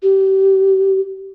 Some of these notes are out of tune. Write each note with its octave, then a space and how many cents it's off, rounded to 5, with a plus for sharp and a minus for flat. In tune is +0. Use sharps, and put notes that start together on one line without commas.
G4 -30